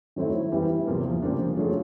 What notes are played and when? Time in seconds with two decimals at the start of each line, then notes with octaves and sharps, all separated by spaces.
0.16 D#3 F#3 A3 C4 E4
0.52 E3 G3 B3 E4 G4
0.87 E2 C3 F3 A#3
1.22 C#3 F3 A#3 D4 G4
1.57 F#3 A3 D4 F4 G#4